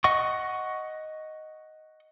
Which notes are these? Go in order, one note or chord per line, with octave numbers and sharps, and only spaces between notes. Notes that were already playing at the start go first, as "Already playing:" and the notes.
D#5 F#5 C#6